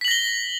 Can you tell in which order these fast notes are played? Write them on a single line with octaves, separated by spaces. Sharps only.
B6 F#7 A#6 G7